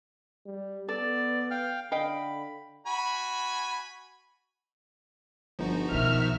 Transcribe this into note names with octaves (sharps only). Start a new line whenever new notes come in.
G3
B3 A4 D5
F5 G5 F6
D3 D#5 F5 G5 B5
F#4 G#5 B5
G1 F3 D#4 F#4
C2 B2 D#3 E5 F6